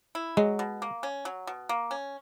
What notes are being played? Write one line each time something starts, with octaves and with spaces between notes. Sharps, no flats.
E4
F#3 G#3
B2
A#3
C#4
F#3
B2
A#3
C#4